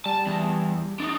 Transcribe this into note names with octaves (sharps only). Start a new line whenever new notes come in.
G3 A5
E2
D4 D#4